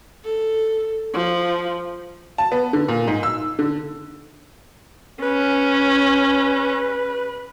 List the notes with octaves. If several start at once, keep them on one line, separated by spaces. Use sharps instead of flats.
A4
F3
A5
B3
D3
A#2
G#2
E6
D3
C#4 B4